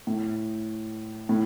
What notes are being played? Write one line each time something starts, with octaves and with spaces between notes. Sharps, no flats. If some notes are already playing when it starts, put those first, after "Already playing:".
A2
A2